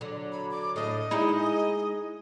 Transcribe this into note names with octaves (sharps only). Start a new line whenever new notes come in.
D3 F#3
B5
D6
A2 D4 D#5
G#3 D#4 E4